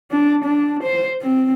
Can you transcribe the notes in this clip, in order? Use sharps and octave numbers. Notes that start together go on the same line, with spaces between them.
D4
D4
C5
C4